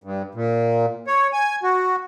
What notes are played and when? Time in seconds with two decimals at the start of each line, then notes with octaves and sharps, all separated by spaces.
0.04 G2
0.35 A#2
1.07 C#5
1.33 G#5
1.63 F#4